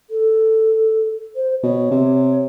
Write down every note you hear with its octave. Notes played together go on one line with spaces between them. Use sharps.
A4
C5
B2 C#5
C3